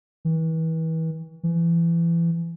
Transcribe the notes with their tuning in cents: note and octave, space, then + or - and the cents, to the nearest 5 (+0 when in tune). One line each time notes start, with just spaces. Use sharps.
E3 -35
E3 +30